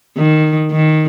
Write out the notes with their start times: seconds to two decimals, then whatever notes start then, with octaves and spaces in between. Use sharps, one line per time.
0.17 D#3
0.72 D#3